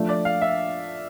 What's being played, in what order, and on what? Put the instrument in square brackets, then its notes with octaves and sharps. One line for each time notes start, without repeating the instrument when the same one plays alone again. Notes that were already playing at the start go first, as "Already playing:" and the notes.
Already playing: [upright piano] F3 A3 D4
[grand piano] D5
F5
E5